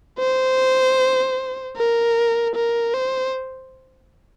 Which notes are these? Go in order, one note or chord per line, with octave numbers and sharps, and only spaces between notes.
C5
A#4
A#4
C5